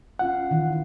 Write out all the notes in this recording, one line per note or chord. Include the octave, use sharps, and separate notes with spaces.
C#4 F4 F5 F#5
D#3 E3 E4